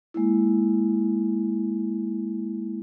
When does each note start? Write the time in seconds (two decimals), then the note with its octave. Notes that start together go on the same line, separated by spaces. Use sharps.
0.14 G#3 A#3 E4